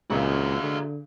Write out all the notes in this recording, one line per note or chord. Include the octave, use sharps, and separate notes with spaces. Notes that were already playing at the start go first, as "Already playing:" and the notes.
C#2 A#2 C#3 G#3 F#4 E5
D3